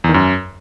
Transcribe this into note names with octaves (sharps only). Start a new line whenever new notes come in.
E2
D#3
F#2